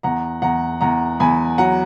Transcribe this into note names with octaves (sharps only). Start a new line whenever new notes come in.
E2 F#5 A#5
E2 F#5 A#5
E2 F#5 A#5
E2 G#5 B5
F#3 F#5 A#5